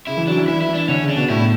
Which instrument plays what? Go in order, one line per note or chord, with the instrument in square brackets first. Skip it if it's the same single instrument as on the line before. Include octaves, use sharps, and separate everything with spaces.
[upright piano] C#3 [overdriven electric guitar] E4
[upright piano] E3
[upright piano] F#3 [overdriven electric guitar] D4
[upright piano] E3
[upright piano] E3 [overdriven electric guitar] E4
[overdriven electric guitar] E4
[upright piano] E3
[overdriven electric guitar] D4
[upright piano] D3 [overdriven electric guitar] C#4
[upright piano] C#3
[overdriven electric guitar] D4
[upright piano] B2
[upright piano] A2 [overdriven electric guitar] E4